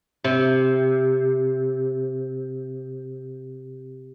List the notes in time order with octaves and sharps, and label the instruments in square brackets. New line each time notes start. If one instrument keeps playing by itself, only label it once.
[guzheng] C3